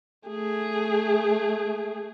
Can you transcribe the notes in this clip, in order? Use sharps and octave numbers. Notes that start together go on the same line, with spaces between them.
A3 G#4